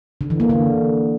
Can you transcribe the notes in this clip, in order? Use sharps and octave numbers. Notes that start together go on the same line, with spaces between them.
D3
E3
A#3
D3